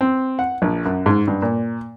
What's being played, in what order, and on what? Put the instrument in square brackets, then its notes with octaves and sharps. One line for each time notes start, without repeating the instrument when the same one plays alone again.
[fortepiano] C4
F#5
A#1
F#2
G#2
G2
A#2